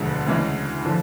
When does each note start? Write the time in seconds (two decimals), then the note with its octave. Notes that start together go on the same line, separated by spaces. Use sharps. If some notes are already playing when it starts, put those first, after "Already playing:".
Already playing: E1 D2 D3 F3 G#3
0.26 D2 C#3 E3 G#3
0.85 D3 F3